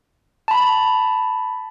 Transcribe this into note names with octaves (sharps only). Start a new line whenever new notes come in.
A5 B5